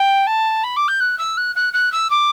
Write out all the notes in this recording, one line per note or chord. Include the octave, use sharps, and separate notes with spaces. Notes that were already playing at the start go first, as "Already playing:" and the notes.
Already playing: G5
A5
B5
D6
G6
F#6
E6
F#6
F#6
F#6
E6
D6